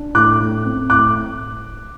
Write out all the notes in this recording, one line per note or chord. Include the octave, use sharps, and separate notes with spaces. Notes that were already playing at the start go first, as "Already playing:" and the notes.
Already playing: D4
A2 D6 F#6
A2
C4
A2 D6 F#6